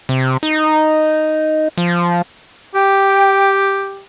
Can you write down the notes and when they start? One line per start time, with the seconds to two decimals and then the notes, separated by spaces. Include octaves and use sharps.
0.09 C3
0.43 D#4
1.78 F3
2.75 G4 G5